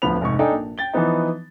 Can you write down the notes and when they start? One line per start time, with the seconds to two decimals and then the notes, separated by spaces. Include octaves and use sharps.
0.02 D1 D2 F3 B3 B5 F7
0.21 F1 G#2 C#6
0.39 D4 D#4 A4 G5 G#5
0.52 A#1
0.78 G5 A6 G7
0.93 E3 F3 B3 D#4